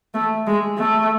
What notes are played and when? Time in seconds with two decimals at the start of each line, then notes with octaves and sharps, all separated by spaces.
0.14 A3
0.47 G#3
0.78 A3